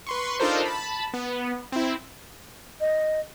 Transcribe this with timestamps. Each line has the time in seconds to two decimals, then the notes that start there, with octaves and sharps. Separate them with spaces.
0.07 B4 C6 C#6
0.40 D4 D#4 F4 A4 A#4 C5
0.65 A5 B5
1.14 B3
1.72 C4 E4
2.81 D#5